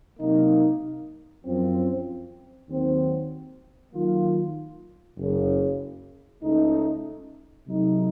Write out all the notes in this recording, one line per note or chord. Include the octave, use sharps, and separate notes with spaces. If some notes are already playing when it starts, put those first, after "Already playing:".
C3 F#3 A#3 D#4
F#2 F3 C4
D#2 D#3 F#3 C4
D#3 F#3 A#3 F4
F#1 F#2 C#3
C#2 C#3 A3 D#4
C3 F#3 A3 D#4